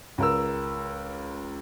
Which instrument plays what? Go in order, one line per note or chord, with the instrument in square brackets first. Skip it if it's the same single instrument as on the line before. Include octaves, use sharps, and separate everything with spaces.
[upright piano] C#2 A#4 E6